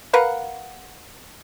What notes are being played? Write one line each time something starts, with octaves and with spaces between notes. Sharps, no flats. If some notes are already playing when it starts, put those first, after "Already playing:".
A#4 B4 F5 F#5